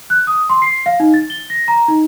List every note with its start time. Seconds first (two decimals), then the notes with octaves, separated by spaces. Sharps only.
0.10 F#6
0.27 D#6
0.49 C6
0.62 C7
0.86 F5
1.00 D#4
1.14 A6
1.30 G7
1.50 A#6
1.68 A#5
1.88 D#4